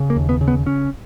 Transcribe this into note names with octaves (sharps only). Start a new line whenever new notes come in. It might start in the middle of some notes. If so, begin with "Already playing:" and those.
Already playing: C#3
A#3
D#2
B3
C#3
B3
C#3 C#4